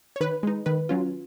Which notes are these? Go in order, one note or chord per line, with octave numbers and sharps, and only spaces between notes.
C#5
D#3 B4
G#3 D#4
D#3 B4
F#3 C#4 F4